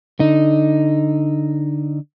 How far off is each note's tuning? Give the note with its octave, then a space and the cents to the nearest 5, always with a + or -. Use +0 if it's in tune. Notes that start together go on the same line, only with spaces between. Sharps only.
D3 +0 D#4 +0